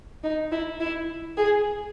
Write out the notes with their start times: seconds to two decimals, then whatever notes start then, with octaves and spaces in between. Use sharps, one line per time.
0.23 D#4
0.52 E4
0.80 E4
1.37 G#4